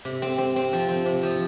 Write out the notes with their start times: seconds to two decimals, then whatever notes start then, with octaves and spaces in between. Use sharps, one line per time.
0.05 C3
0.22 C4
0.38 C4
0.56 C4
0.73 F3
0.89 C4
1.06 C3
1.23 F3